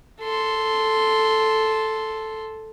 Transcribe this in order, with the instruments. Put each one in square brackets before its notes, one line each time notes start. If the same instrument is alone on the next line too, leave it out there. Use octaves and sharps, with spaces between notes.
[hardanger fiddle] A4 C6